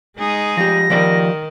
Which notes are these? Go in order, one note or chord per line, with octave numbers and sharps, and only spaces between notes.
G#3 D#4 G#4
F3 G4 A#6
D#3 F3 G4 D5